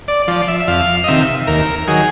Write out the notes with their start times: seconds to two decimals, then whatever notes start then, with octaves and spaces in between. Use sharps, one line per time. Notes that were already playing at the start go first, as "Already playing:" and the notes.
0.08 D5
0.27 F3 D5
0.48 E5
0.60 E5
0.68 F2 F5
1.04 D#5
1.08 C3 D#3 E5
1.47 D#2 A#4
1.87 D#3 F#3 G#4